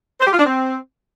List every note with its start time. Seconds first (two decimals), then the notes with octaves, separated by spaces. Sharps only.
0.20 C5
0.26 G4
0.33 F4
0.39 D4
0.46 C4